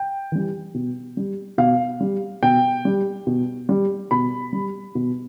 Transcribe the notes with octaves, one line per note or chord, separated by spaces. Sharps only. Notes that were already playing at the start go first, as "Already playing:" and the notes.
Already playing: G5
E3 G3
B2
G3
B2 F5
G3
B2 G5
G3
B2
G3
B2 B5
G3
B2